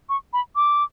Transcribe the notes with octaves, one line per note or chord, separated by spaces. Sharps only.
C#6
B5
D6